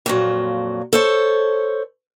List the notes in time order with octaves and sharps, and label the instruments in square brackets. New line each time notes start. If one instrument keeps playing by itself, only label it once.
[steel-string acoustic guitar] F2 A#2 F#3
A4 C5 C#5